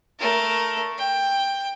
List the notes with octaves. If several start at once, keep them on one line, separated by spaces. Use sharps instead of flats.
A3 A#4
G5